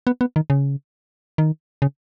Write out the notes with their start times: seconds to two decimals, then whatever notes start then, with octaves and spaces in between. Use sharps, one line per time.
0.07 B3
0.21 B3
0.36 D#3
0.50 C#3
1.38 D#3
1.82 C#3